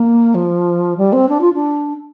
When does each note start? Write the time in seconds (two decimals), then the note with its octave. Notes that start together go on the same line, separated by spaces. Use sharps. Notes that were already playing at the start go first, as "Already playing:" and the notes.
Already playing: A#3
0.34 F3
0.97 G3
1.12 C4
1.29 D4
1.41 F4
1.54 D4